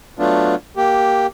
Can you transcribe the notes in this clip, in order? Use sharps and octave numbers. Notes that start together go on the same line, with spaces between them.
F#3 A3 B3 D4 F4
A#3 G4